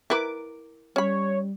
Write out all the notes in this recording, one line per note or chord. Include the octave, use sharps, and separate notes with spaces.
E4 A#4 B4 D6
G3 C#4 C#5 B5